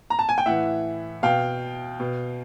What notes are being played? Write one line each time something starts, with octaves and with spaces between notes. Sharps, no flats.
A#5
A5
G#5
G5
A2 E3 E5 F#5
B2 F5 G5
B2